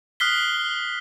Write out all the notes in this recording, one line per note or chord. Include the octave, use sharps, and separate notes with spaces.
D#6 F6 F#6 B6 C7 G7